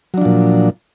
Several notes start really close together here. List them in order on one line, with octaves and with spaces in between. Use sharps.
F#3 D4 F3 A#2